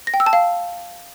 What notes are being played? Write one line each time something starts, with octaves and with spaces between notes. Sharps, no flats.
A#6
G5
E6
A5
F5